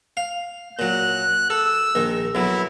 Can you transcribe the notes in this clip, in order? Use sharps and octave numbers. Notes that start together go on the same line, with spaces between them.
F5
A#2 F#3 F#6
A4 E6
A#1 D#3
B1 F#3 E4